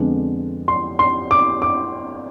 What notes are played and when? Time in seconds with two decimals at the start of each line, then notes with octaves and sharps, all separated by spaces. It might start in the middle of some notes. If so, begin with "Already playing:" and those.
Already playing: F2 D3 G#3 B3 D4
0.68 C6
0.99 C6
1.31 D6
1.62 D6